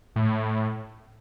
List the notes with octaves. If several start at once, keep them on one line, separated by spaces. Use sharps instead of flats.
A2